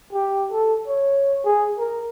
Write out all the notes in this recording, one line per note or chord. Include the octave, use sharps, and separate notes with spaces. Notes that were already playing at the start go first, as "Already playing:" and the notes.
G4
A4
C#5
G#4
A#4